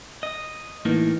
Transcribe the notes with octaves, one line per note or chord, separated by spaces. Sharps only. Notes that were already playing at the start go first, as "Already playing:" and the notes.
D#5
A2 E3 A#3 D#4